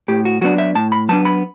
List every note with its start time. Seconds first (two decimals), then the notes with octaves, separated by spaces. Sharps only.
0.08 A2 G4
0.25 F#4
0.41 F#3 B3 D4 F#4
0.58 E5
0.75 A2 A5
0.92 B5
1.09 F#3 B3 D4 A5
1.25 B5